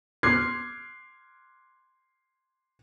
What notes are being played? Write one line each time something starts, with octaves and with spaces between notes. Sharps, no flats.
C6 D6 F6 F#6 G#6 C7